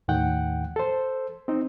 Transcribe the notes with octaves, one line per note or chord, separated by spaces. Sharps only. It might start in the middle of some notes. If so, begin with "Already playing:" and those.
D#2 A2 D#3 F#5 G5
A4 C5
C4 D#4